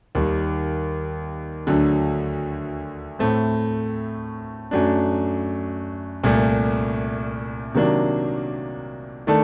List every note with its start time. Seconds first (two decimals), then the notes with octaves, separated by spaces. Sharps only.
0.15 D#2 D#3 G3
1.67 D2 D3 F#3 A3
3.19 A2 A3 C4
4.71 F#2 F#3 A3 D4
6.23 C2 A#2 A3
7.74 C3 D#3 F#3 A#3 D4
9.27 D#3 A3 D4 A4